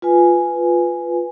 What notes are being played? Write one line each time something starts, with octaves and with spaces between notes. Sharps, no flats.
F4 B4 G#5